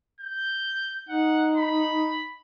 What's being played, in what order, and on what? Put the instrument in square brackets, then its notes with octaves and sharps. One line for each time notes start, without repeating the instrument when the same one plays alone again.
[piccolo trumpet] G6
[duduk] D#4 [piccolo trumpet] F#5
[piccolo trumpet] B5